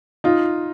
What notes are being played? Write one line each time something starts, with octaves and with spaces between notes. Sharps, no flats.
D#4 F4